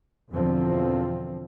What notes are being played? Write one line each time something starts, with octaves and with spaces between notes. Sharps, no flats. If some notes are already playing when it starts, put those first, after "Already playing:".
E2 B2 D3 F3 C4